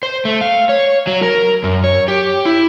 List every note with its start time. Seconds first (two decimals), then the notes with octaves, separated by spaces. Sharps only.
0.03 C5
0.25 A3
0.41 F5
0.69 C#5
1.07 F#3
1.23 A#4
1.64 F#2
1.84 C#5
2.08 G4
2.45 E4